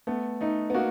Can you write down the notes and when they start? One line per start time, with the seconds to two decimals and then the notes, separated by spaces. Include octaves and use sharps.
0.07 A3 B3
0.41 A3 D#4
0.70 B3
0.74 A#3 F#4